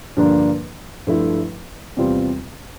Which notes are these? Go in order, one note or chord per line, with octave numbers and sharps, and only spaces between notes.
G2 D3 F3 A#3 D4
G2 F3 A3 E4
E2 C3 G3 C4 F4